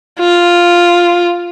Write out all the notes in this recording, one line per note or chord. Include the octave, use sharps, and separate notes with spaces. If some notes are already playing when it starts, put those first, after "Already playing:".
F4